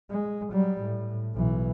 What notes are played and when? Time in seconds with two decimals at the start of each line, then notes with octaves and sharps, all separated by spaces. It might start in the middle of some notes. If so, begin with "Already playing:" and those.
0.10 G#3
0.52 F#3 G3
0.81 A2
1.34 B1 E3